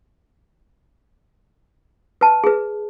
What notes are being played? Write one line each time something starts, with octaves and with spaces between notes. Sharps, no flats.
B4 A5
G#4 B4